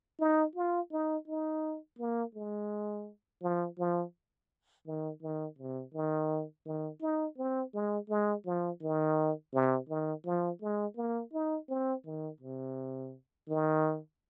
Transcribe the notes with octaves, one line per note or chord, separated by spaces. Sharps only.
D#4
F4
D#4
D#4
A#3
G#3
F3
F3
D#3
D#3
C3
D#3
D#3
D#4
C4
G#3
G#3
F3
D#3
C3
D#3
F3
G#3
A#3
D#4
C4
D#3
C3
D#3